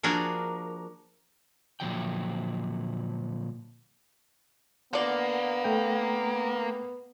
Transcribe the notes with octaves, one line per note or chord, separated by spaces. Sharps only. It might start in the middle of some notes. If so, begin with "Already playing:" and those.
F3 A#3 D4 F#4 G#4 A#4
A#2 D3 F3 F#3 F#4 G5
D3 A#3 B3 D5
A3 G5